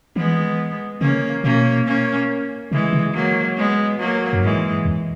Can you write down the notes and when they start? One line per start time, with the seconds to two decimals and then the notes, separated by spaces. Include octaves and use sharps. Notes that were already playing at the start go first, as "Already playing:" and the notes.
0.16 E3 G#3 B3
1.01 C#3 A#3 C#4
1.44 B2 A#3 C#4
1.86 A#3 C#4
2.72 C#3 E3 G#3
2.93 C#3
3.14 F#3 A#3
3.57 G#3 B3
4.00 F#3 A#3
4.33 F#2
4.42 G#2 E3 G#3
4.85 E2